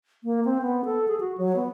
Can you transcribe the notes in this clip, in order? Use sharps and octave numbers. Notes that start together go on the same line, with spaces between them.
A#3
C4
B3
A4
G#4
F#4
F#3
B3